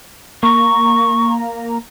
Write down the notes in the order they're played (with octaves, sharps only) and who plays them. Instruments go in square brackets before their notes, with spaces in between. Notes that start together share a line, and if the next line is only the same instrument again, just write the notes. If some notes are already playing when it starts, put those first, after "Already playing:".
[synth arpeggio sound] A#3 A#5 [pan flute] C#6